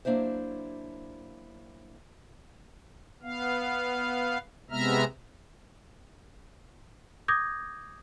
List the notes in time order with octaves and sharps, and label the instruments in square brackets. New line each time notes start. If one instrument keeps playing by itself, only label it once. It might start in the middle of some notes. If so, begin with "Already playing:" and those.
[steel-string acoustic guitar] F#3 A3 A#3 D4 E4 C5
[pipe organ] B3 F5
C3 G#3 B3 E5 A#5 F6
[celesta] D6 D#6 G6 G#6 A#6